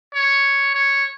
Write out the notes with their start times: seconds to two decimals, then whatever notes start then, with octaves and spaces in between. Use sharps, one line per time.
0.14 C#5
0.74 C#5